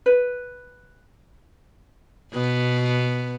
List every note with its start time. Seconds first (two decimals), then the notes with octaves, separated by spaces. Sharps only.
0.06 B4
2.33 B2 B3